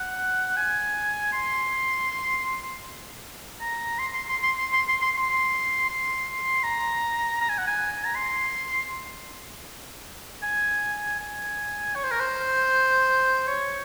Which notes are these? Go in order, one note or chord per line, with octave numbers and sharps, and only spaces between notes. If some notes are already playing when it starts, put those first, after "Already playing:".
Already playing: F#5
G#5
C6
A#5
C6
C6
C6
C6
C6
C6
C6
C6
C6
C6
A#5
A#5
G#5
F#5
G#5
A#5
C6
G#5
G#5
C#5
C5
A#4
C5
C#5